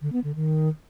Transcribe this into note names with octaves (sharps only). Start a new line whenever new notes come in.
D3
B3
D3
D#3